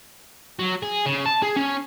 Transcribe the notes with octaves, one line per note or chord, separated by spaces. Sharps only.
F#3
G#4
C#3
A5
G#4
C#4